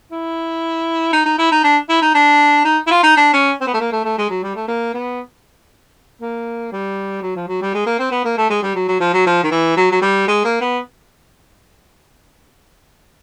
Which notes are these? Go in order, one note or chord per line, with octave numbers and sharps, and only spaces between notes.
E4
D#4
D#4
E4
D#4
D4
E4
D#4
D4
D#4
E4
F4
D#4
D4
C#4
C4
B3
A3
A#3
A3
A3
G#3
F#3
G3
A3
A#3
B3
A#3
G3
F#3
F3
F#3
G3
G#3
A#3
C4
B3
A#3
A3
G#3
G3
F#3
F#3
F3
F#3
F3
D#3
E3
F#3
F#3
G3
G#3
A#3
B3